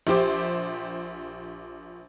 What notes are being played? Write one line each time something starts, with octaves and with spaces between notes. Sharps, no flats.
A#1 G4 C5 D6